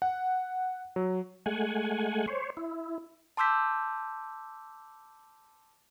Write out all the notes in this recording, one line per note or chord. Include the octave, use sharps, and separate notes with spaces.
F#5
F#3
G#3 A3 F#5 G#5
C5 C#5
E4
A5 C6 D6 E6 G6 B6